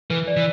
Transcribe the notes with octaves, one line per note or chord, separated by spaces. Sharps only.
E3 B4
D5
E3